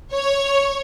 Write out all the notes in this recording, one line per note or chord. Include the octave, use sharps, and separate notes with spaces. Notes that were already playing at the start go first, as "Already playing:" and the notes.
C#5